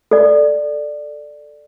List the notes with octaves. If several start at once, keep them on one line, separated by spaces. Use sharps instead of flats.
A4 D5